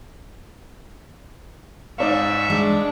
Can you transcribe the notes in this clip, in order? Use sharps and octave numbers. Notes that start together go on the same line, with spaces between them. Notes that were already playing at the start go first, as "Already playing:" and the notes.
G#2 D#4 D5 E5 F5 C#6
G#3 D4